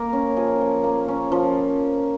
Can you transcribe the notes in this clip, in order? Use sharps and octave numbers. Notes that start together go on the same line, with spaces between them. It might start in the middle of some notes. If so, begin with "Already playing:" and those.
Already playing: A#3 A#4
C#4
F3 G#4
F3
A#3
C#4
F3